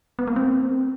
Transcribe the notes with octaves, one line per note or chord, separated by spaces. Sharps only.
B3
A#3
C4